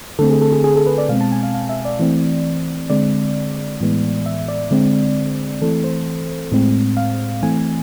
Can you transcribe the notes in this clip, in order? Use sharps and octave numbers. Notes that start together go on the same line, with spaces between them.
D3 A3 C4 A4
G#4
A4
G#4
G#4
A4
B4
D5
B2 G#3 C4 F5
A5
G#5
F5
F5
E5
D5
E3 A3 C4
D3 G#3 C4 D5
A2 E3 G#3 B3
E5
D5
D3 G#3 C4
E3 A3 C4 A4
C5
A2 G#3 C4
F5
E3 A3 C4 G#5